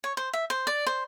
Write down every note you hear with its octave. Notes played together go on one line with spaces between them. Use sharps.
C#5
C5
E5
C5
D5
C5